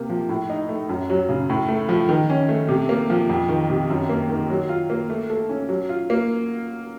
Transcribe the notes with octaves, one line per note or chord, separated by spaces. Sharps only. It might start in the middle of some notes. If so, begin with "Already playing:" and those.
Already playing: C3 A#3
F3
A2
D#4
A3
F#2
F#3
C#3
A2
A3
F3
D#3
C#4
A3
C3
A#3
F3
F2
D#3
C3
F#2
A#3
D#3
F#3
F4
A#3
A3
A4
C#4
F#3
F4
A#3